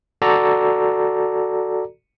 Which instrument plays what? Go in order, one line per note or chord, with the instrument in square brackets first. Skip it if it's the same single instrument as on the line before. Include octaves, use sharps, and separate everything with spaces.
[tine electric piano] F#4 A4 D5 A#5